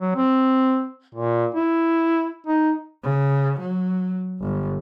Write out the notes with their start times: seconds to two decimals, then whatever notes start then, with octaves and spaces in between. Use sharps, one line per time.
0.01 F#3
0.15 C4
1.15 A#2
1.55 E4
2.46 D#4
3.04 C#3
3.60 F#3
4.41 G1